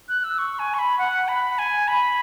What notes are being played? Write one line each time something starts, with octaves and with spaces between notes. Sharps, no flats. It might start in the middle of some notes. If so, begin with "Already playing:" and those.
F#6
E6
C#6
G#5
C#6
B5
F#5
B5
G#5
B5